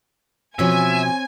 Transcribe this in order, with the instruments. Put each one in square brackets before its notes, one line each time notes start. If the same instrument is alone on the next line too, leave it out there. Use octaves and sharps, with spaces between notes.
[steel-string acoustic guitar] B2 F3 [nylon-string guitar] C4 C#4 C#5 [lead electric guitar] E5 [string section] G#5